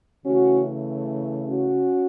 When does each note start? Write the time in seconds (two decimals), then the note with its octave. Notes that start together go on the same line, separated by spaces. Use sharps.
0.24 C#3 E3 A3 C#4 F#4
1.48 C#4 F#4